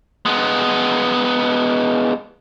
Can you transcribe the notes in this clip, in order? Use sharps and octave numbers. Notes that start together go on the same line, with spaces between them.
G#3 B3